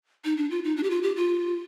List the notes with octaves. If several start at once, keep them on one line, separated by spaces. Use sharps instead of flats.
D#4
D4
F4
D#4
D4
G4
F4
G4
F4